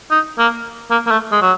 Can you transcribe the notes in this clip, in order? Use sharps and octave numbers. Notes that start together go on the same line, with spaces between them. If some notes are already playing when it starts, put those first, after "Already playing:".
D#4
A#3
A#3
A#3
A3
G#3
F#3